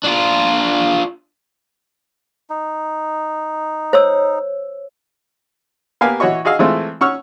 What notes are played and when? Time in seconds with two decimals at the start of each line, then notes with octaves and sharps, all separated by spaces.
0.04 D4 F4
2.50 D#4
3.93 C5 C#5 E6
6.01 A#3 B3 G4 F5 G#5
6.20 E3 F#4 C#5 D#5 C#6
6.45 F#4 G#4 D#5 F5 E6
6.59 E3 G#3 A3 C4 F4
7.01 C#4 F#5 C#6 E6 F6